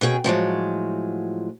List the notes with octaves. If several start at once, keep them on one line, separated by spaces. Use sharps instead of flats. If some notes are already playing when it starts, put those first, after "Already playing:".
B2 C#4 G#4 G5
A2 F3 F#3 G#3